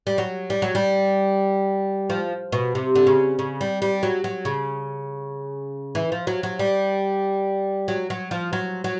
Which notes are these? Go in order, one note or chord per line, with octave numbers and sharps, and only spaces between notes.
G3
F#3
G3
F#3
G3
F3
B2
C3
D3
C#3
C#3
G3
G3
F#3
F#3
C#3
E3
F3
F#3
F#3
G3
F#3
F#3
F3
F#3
F#3